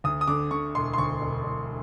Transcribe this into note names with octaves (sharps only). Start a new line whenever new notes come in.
D2 D#6
D#6
D3 D6
D3 C#6
E1 C6
C6
D2 C#6
E1
E1